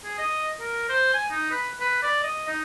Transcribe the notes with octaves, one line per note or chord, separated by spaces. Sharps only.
G#4
D#5
A#4
C5
G#5
D#4
B4
B4
D5
D#5
D#4